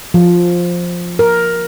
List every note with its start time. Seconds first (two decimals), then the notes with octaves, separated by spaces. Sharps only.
0.14 F3
1.19 A#4